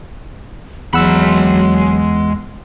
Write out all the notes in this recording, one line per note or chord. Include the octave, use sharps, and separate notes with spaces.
E2 F#3 G#3 F#5 B5 E6